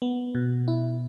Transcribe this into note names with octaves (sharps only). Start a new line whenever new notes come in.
B3
B2
E4